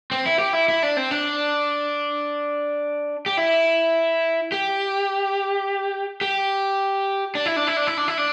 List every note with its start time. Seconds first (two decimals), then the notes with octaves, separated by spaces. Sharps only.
0.11 C4
0.26 E4
0.39 G4
0.53 E4
0.68 E4
0.83 D4
0.97 C4
1.11 D4
3.26 G4
3.37 E4
4.52 G4
6.21 G4
7.35 D4
7.46 E4
7.56 D4
7.67 E4
7.77 D4
7.87 E4
7.98 D4
8.08 E4
8.18 D4